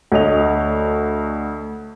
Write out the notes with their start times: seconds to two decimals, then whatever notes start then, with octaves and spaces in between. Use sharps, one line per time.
0.12 D2 C#5 D#5 F7